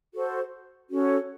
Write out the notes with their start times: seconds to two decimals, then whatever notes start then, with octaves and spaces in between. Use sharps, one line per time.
0.13 F#4 A4 C5
0.89 C#4 F#4 A4 C#5